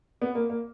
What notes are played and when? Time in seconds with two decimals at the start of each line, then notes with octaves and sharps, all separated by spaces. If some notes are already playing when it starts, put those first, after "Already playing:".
0.22 B3
0.35 A#3
0.50 A#3